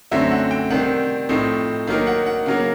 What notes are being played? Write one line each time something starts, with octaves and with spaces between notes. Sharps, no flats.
F#2 D3 F#3 A3 C4 E5
F#5
G5
C3 D#3 G3 C4 F#5
A2 F3 A3 C4 D#4
D#3 F#3 A#3 D#4 F5
F#5
F#5
C#3 F#3 A#3 F5